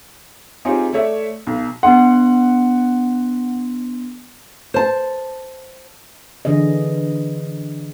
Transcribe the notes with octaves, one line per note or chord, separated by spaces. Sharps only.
C4 D#4 F4 G4 G#4 C#5
A3 C#5 D5 E5
B1
B3 D4 F#5 C6
C5 A5
D3 E3 D4 G#4 D#5